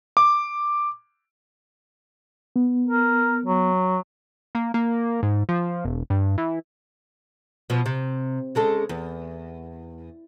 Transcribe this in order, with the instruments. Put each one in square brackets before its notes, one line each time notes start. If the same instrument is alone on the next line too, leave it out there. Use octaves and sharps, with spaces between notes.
[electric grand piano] D6
[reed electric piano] B3
[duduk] A#4
F#3
[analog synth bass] A#3
A#3
G#2
F3
E1
G2
E3
[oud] B2 F3
C3
C#3 G#3 A4
E2